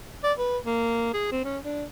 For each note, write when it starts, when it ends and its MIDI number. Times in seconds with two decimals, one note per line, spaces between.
0.24 0.33 74
0.38 0.58 71
0.65 1.11 58
1.14 1.31 68
1.32 1.45 60
1.45 1.58 61
1.64 1.85 62